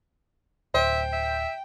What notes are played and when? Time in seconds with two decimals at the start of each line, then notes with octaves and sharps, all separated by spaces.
0.74 D1 C5 E5 G5
1.12 E5